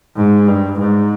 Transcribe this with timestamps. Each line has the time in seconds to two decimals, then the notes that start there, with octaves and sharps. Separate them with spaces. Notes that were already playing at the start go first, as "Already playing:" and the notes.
0.17 G#2
0.48 G2
0.79 G#2